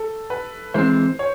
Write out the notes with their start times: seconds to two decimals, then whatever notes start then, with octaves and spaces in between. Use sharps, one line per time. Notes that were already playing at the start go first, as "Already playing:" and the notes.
Already playing: A4
0.30 B4
0.74 E3 G#3 C4 C5
1.19 C#5